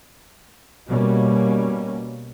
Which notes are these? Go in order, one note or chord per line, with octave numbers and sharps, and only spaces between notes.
B2 G3 A#3 C#4